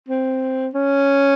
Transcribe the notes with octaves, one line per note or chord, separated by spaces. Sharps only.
C4
C#4